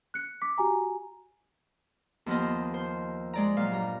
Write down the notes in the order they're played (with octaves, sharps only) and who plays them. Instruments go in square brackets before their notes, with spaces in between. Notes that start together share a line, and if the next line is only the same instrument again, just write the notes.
[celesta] F#6 C#7
D6 B6
F#4 G4 G#5 A#5
[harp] D#2 F3 B3 F4 C5 D#5
C5
G#3 D5 A#5
A#2 F#3 F5
G2 A#5